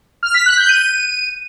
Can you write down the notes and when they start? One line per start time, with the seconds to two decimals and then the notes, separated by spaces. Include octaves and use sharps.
0.23 F6
0.34 B6
0.46 F#6
0.57 G6
0.69 D#7